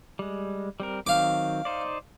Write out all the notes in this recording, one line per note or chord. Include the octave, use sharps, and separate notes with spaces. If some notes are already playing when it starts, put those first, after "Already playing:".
G3 G#3
G3 C4 A#4
D#3 F#3 C4 F5 D6
D#4 C5 D5